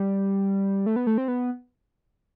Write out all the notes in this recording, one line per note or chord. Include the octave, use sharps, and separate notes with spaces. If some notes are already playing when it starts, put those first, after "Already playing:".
Already playing: G3
A3
B3
A3
C4
B3